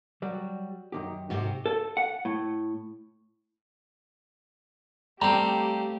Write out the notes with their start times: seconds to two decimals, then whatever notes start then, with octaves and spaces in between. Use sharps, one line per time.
0.22 F#3 G3 F#4
0.92 F#2 D#3 G4
1.30 G#2 C3 F#4 G4 C5
1.66 A4
1.97 F#5
2.25 A2
5.22 G3 A3 C4 G4 F5 A#5